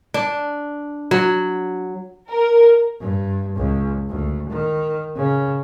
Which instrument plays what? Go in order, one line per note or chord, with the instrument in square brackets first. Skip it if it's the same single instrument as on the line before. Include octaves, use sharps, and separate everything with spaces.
[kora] D4
F#3
[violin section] A#4
[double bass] G2
C#2
D2
D#3
C#3